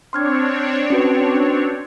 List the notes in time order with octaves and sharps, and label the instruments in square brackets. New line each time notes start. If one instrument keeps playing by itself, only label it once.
[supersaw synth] C4 D4 C#5 [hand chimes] C6 F6 G#6
[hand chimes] C#4 F#4 B4